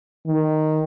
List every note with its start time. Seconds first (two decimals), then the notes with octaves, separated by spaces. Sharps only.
0.27 D#3